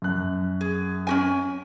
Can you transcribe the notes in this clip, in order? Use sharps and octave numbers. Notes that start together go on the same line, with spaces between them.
F#2 F#6
G#4
C#4 F#4 G#5